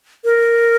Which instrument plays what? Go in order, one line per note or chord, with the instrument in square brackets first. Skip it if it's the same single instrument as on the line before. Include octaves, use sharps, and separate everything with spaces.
[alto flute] A#4